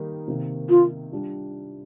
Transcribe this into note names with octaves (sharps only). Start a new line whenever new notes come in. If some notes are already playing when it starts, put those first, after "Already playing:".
Already playing: D#3 G3 A#3 D#4
C3 D#3 A#3
F4
G3 D4 F4